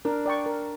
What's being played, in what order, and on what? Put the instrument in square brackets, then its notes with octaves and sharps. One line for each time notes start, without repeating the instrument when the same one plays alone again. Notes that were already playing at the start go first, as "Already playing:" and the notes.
[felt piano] D4 [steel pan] A#4
[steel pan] D5 G5 C#6
A#4